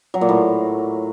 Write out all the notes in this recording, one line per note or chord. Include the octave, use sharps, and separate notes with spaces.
F#3
A#2
A2